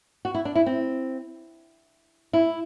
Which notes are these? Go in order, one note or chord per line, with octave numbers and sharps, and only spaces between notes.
F#4
E4
D4
E4
C4
E4